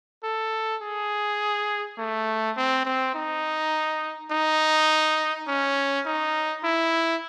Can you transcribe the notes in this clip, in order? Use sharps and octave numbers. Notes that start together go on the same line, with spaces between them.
A4
G#4
A3
C4
C4
D#4
D#4
C#4
D#4
E4